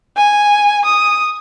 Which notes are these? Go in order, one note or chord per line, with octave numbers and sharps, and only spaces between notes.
G#5
D#6